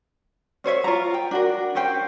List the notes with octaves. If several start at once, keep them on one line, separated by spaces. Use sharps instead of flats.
C#4 C5 C#5 E5
F4 A#5
G5
D4 F#4 A#4
C#4 G4 C5 G5